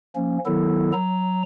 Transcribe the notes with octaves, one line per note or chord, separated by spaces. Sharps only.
F3 A#3 C#4
D#3 F#3 B3 E4 A4
F#3 A#5